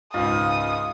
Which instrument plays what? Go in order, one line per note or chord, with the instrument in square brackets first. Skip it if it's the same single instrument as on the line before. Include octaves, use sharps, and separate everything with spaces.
[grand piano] C#2 G#2 [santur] F4 [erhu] D#6